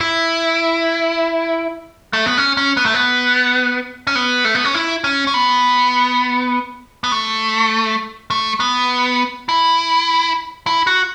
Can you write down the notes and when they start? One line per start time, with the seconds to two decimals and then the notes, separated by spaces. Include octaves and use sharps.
0.01 E4
2.13 A3
2.26 B3
2.38 C#4
2.57 C#4
2.77 B3
2.86 A3
2.94 B3
4.07 C#4
4.15 B3
4.45 A3
4.55 B3
4.65 C#4
4.75 E4
5.04 C#4
5.27 C#4
5.34 B3
7.04 B3
7.12 A3
8.30 A3
8.60 B3
9.49 E4
10.67 E4
10.87 F#4